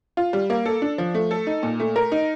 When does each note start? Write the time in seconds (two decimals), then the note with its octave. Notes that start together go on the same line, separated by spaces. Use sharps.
0.17 F4
0.33 G3
0.50 A#3
0.66 A4
0.82 D4
0.98 F3
1.15 A3
1.31 A4
1.47 D#4
1.63 A#2
1.80 A3
1.96 A#4
2.12 D#4